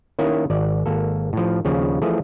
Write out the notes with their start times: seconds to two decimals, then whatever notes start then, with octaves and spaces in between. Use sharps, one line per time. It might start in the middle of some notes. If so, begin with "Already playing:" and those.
0.19 D#3 A#3 C#4 E4 G#5
0.50 G#1 D5
0.86 G#1 A#3 A4
1.33 A2 F3
1.65 D#2 C#3 F3
2.02 E3 F3 A3 G#4